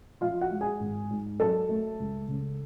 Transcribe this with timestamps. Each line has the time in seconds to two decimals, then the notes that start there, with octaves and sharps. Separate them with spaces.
0.21 F3 F4 F5
0.41 F#4 F#5
0.51 G#3
0.61 G#4 G#5
0.80 G#1
1.11 G#2
1.40 F#3 A4 A5
1.69 A3
2.00 C#2
2.28 C#3